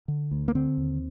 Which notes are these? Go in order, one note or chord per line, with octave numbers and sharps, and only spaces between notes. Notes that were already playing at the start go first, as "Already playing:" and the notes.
D3
D2
A#3
D3 C4
D#2